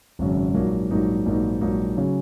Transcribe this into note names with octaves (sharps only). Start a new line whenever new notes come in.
G#1 F#2 C#3 F#3
A#1 G#2 F#3 A#3 D#4
A#1 G#2 F#3 A#3 D#4
A#1 G#2 F#3 A#3 D#4
A#1 G#2 F#3 A#3 D#4
C#3 F#3 C#4